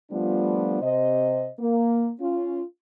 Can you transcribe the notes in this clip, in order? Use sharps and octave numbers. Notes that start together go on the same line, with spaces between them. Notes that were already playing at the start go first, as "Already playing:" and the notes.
F3 G3 A3 B3 D4 F4
C3 C5 D#5
A#3
C#4 F4